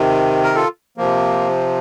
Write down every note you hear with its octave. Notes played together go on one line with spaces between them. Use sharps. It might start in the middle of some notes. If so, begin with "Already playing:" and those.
Already playing: C3 D#3
A#4
F4 A4
C3 F3 A#3